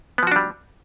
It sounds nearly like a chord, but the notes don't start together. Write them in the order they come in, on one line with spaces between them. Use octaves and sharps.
B3 F3 F#4 D4 G3